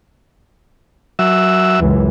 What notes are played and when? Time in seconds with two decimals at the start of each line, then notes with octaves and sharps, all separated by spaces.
1.19 F#3 E5
1.78 C#2 F#2 E3